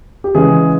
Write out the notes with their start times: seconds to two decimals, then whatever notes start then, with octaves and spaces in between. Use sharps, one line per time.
0.24 G4
0.35 C#3 E3 G#3 G#4